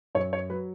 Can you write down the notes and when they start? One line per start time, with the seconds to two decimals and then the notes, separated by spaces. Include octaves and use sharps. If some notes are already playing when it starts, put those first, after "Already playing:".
0.15 F#2 C#5
0.33 C#5
0.50 F#3 B4